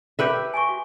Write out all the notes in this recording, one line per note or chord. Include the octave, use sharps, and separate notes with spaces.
G4 B4 E5
G#5 C6 C#6
F#4